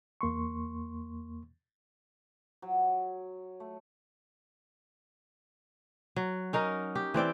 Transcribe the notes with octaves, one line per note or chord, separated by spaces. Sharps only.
E2 A#3 C6 C#6
F#3
A3
F#3
C#4 D#4 A#4
G4
E3 C4 D5 G5